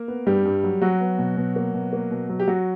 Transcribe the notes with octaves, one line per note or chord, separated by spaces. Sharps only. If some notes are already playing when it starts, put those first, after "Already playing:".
Already playing: A#3 A#4
B3
G2 G3 G4
G2
F#3
F#3 F#4
B3
B2
B2
A#3
B2
A#3
B2
F#3
G4
F#3 F#4